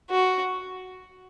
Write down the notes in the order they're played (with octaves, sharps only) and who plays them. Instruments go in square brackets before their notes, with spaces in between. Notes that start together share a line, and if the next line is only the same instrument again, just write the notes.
[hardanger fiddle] F#4